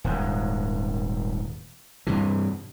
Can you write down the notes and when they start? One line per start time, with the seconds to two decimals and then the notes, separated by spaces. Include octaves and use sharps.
0.04 D#1 G#2
2.07 G2 C3 E3